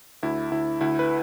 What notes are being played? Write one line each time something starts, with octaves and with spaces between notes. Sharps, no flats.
D2 E4
D2 E4
D2 E4
B4